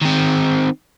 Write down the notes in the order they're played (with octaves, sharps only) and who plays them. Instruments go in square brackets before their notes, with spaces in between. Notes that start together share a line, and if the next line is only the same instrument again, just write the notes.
[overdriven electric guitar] D#3 C4